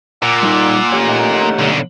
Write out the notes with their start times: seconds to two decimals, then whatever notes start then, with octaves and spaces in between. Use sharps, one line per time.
0.22 A#2 F#5 D6 E6
0.43 G3 D#4
0.92 A3 G4 C#5
1.08 D#4 F#5
1.59 B1 D3